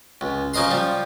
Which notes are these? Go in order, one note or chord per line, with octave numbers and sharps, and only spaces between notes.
C#2
C#3 F3 D#5 A#5 C6
F3 G3